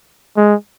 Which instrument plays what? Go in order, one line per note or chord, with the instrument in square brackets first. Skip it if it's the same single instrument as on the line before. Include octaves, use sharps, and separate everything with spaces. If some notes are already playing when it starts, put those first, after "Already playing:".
[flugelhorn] G#3